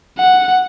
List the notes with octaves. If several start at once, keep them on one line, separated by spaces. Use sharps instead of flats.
F#5